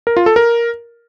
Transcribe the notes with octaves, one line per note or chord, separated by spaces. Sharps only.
A#4
F4
A4
A#4